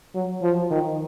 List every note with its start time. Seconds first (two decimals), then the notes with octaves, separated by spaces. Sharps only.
0.15 F#3
0.42 F3
0.71 D#3